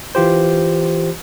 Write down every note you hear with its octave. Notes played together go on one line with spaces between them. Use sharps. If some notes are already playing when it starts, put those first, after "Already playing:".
E3 F4 G4 C5